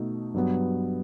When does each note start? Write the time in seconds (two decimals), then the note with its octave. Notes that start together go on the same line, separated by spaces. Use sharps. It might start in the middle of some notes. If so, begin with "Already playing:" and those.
Already playing: B2 A3 D#4
0.34 G2 F#3 B3